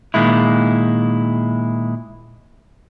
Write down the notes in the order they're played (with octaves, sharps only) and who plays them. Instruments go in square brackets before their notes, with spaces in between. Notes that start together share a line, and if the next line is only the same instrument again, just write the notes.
[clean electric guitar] A#2 D#3 G#3 E4